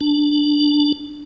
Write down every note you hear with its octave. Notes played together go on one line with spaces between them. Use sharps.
D4